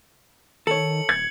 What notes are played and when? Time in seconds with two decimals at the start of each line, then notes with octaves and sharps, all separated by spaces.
0.67 D#3 A4 C#5 C#7 F#7
1.09 D#1 G#6